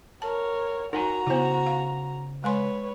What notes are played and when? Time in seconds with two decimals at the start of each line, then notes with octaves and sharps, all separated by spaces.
0.22 A#4 C#5 A5
0.93 D#4 F#4 A#4 F#5 G#5 A#5
1.27 C#3 B3 E4 C5
1.67 F5
2.44 G#3 B4 C#5 G#5 C6